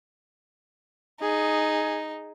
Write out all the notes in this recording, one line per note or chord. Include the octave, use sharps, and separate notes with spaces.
D#4 G#4